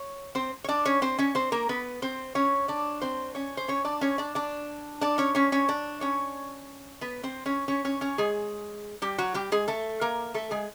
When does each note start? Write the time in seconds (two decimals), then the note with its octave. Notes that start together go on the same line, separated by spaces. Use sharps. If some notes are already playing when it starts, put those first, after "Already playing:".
Already playing: C#5
0.35 C4 C5
0.64 C#5
0.68 D4 D5
0.85 C#4 C#5
1.02 C4 C5
1.18 C#4 C#5
1.35 C4 C5
1.52 A#3 A#4
1.69 B3 B4
2.02 C4 C5
2.35 C#4 C#5
2.68 D4 D5
3.02 C4 C5
3.35 C#4 C#5
3.57 C5
3.68 C#4 C#5
3.85 D4 D5
4.01 C#4 C#5
4.18 D4 D5
4.35 D4 D5
5.01 D4 D5
5.18 C#4 C#5
5.35 C#4 C#5
5.52 C#4 C#5
5.69 D4 D5
6.01 C#4 C#5
7.01 B3 B4
7.23 C4 C5
7.46 C#4 C#5
7.68 C#4 C#5
7.85 C#4 C#5
8.01 C#4 C#5
8.18 G#3 G#4
9.02 G3 G4
9.18 F#3 F#4
9.34 G3 G4
9.52 G#3 G#4
9.68 A3 A4
10.01 A#3 A#4
10.34 A3 A4
10.51 G#3 G#4